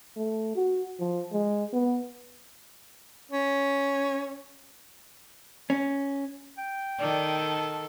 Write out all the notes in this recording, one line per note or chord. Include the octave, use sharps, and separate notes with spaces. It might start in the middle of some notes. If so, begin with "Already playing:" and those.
A3
F#4
F3
G#3
B3
C#4
C#4
G5
D#3 A4 D5
A5